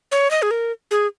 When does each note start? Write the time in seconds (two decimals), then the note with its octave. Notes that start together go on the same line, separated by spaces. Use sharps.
0.12 C#5
0.31 D#5
0.42 G#4
0.51 A#4
0.91 G#4